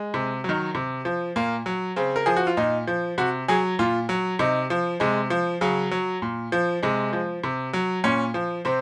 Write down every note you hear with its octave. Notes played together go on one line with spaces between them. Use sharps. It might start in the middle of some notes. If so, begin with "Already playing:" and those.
Already playing: G#3
C3
D#3 F#3
C3
F3
A#2 A#3
F#3
C#3 C4
A#4
F3 G#4
F#4
F4
A#2 D#4
F3
C3 F#4
F#3 G#4
A#2 F4
F#3
C3 D#4
F3
C3 G#3
F3
C#3 F#3
F#3
A#2
F3
C3 G#3
F3
C3
F#3
A#2 C#4
F3
C3 C4